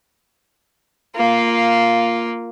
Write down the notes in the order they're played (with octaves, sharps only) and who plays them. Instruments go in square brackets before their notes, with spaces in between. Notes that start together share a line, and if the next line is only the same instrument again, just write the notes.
[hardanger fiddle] A#3 F4